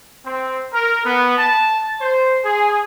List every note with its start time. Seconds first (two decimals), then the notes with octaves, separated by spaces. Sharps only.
0.24 C4
0.73 A#4
1.05 B3
1.38 A5
2.01 C5
2.44 G#4